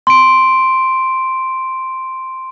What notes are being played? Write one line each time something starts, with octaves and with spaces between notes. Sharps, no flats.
C6 D7